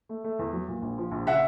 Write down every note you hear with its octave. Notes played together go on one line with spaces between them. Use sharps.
A3
A3
E2
F#3
A#2
A#1
F3
A#1
C#3 E5 F#5